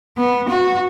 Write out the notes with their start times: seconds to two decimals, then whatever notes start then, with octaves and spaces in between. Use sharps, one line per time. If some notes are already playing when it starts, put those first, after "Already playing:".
0.17 B3
0.48 F#4